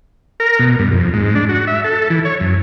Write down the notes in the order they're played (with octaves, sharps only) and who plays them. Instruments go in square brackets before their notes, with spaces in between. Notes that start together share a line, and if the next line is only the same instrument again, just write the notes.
[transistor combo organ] A#4
B2
G2
F2
G#2
D4
F#4
E5
A4
E3
C#5
F#2